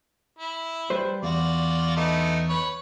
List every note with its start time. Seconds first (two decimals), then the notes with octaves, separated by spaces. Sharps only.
0.39 E4
0.90 G3 B4 C5
1.23 E2 F4 F#4 D5
1.97 A3 B3 D#4
2.49 B4 C#5